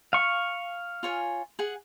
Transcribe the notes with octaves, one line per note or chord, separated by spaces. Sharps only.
F5 C#6
F4 C#5 G#5
G#4 F#5